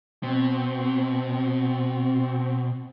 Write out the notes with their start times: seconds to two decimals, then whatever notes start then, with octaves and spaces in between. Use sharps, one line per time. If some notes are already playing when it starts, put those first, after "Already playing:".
0.23 B2 C4